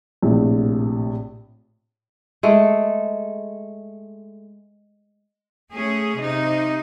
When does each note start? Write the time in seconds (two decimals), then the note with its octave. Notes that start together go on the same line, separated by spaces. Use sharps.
0.22 A#1 A2 C3
2.43 G#3 A3 A4
5.73 A3 C#4 G#4
6.17 C3 D#4